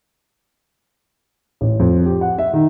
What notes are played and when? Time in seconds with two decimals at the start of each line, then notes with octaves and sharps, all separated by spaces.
1.61 A1
1.79 F2
2.06 G4
2.21 F#5
2.38 E5
2.53 D#3